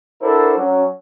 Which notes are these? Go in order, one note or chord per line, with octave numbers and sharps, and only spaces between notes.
D4 E4 F#4 A4 A#4 C5
F#3 C#4